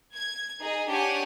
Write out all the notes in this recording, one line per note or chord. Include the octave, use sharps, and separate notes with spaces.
G#6
D#4 G#4
D4 G4 C#5 F#5 G#5